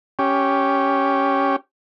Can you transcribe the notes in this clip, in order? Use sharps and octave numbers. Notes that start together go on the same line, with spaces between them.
C#4 G4